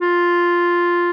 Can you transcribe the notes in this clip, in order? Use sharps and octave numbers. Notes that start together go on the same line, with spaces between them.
F4